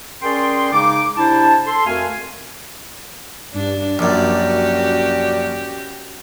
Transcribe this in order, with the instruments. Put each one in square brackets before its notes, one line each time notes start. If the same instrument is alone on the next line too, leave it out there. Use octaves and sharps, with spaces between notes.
[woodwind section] C#4 G#4 A#4 D5 G5 C6
C#3 G#3 D#4 D6
C3 D4 E4 C5 A5
A4 C6
F2 A3 F#4 A#4 F5 G#5
[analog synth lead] G2 [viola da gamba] D4
[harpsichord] A#1 F#2 [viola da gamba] C#4 F#4 G4 [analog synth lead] D5